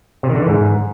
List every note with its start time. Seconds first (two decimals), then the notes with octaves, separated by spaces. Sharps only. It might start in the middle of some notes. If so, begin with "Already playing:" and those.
0.23 C3
0.29 D#3
0.36 D3
0.42 E3
0.48 G#2